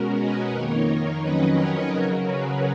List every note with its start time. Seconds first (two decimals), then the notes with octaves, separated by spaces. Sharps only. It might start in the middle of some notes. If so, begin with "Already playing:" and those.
Already playing: B2 G#3 C#4 F#4 A#4
0.17 B4 D#5
0.51 F2 D#3 A#3 D#4 A#4 C#5
1.21 F2 D#3 F#3 C#4 B4 D#5
1.55 A#4 C#5
1.90 C#3 F#3 C#4 F#4 A#4
2.24 G#4 B4